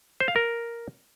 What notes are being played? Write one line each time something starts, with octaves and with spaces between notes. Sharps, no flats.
C5
F5
A#4